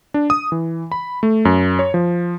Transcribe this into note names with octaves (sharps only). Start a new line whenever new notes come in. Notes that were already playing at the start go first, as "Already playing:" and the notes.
D4
D#6
E3
B5
A3
F#2
C#5
F3